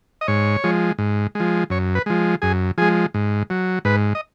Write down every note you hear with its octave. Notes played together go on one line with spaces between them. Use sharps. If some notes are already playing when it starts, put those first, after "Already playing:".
D#5
G#2 C#5
F3 G#3
G#2
F3 G#3
F#2 C#5
B4
F3 G#3
F#2 G#4
F3 G#3 G#4
G#2
F#3
G#2 B4
D#5